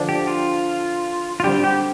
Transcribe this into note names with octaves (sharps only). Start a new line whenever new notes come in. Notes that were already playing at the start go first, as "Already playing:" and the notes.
Already playing: D3 F3 D4
G4
F4
F4
D3 G3 C4 G4
G4